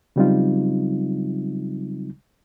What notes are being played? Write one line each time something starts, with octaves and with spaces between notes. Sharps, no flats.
C#3 F#3 G3 C4 D#4 F4